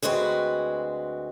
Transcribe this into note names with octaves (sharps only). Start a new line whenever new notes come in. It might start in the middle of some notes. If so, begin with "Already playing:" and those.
D2 G#3 C4 F#4 B4